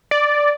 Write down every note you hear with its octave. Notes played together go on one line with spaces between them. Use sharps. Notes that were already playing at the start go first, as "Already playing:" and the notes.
D5